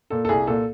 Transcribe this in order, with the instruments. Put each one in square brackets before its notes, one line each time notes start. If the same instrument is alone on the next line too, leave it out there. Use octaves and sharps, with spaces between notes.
[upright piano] A#2 A4
A4
C2 G#4
A#2 A4